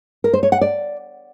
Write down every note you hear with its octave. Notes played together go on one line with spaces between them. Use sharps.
A#4
C5
C#5
F#5
D5